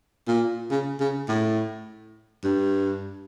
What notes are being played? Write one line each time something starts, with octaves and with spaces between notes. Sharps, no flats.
A#2
C#3
C#3
A2
G2